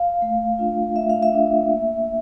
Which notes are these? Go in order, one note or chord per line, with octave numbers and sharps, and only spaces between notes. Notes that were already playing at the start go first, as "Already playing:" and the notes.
Already playing: F5
A3
D4 F4
A3 E5
F5
E5
D4 F4
A#3